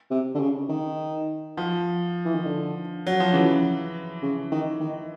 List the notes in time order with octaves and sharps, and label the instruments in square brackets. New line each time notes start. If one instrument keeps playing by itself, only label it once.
[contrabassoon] C3
D3
C#3
D#3
[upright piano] F3
[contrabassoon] E3
D#3
D3
[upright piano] F#3
F3
[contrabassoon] C#3 [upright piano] E3
[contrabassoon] C#3
D#3
D#3